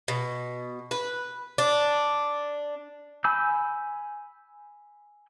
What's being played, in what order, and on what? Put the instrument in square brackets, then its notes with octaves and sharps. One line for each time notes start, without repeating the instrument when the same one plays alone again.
[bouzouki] B2
B4
D4
[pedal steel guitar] G#5 B5 D6 E6 G6